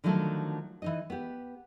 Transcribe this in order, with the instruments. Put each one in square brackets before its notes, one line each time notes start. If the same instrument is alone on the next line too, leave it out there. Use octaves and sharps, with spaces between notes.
[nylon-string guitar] D3 D#3 F3 F#3 A3 A4
E3 D#4 D#5
B3 G4